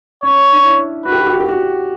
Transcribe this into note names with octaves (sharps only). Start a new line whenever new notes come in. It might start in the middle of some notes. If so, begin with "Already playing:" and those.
C#4 C#5
D4
E4
F#4 B4
G4
F#4
G4
F#4
G4
F#4